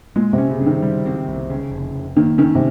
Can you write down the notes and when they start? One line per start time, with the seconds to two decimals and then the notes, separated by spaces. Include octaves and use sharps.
0.16 A#2 G#3
0.33 C3
0.38 C#4
0.50 C#3
0.61 G2
0.66 D#3
0.82 G3
1.06 C4
1.28 C2
1.50 C#3
1.72 F1
1.94 F1
2.16 D#3 A#3
2.38 D#3 C#4
2.55 C3